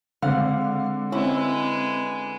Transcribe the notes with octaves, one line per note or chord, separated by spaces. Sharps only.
D3 G#3 C4 F5 F#5
G#3 C4 C#4 E4 B4